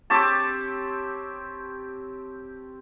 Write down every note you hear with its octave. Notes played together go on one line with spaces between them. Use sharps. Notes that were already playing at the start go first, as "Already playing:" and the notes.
C4 G4 C#5 A5